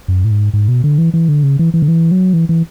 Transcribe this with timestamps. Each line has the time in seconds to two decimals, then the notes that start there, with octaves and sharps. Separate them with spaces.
0.08 F#2
0.24 A2
0.31 G#2
0.53 G#2
0.68 B2
0.84 D3
0.98 E3
1.14 E3
1.28 D3
1.43 C#3
1.59 E3
1.74 E3
1.82 D3
1.88 E3
2.11 F#3
2.33 E3
2.49 E3